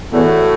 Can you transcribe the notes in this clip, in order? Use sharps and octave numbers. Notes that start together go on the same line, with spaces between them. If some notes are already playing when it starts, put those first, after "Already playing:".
E2 A2 A3 F#4